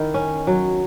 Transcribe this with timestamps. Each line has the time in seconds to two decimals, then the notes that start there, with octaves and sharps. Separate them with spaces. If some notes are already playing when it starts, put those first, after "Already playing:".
Already playing: D#3 E4
0.14 C#4
0.47 F#3